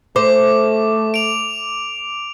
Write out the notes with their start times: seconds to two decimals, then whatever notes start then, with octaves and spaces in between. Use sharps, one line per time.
0.16 A3 C5 D6
1.14 D7 F7